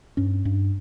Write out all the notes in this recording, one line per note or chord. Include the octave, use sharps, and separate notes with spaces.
G2 C#4
G2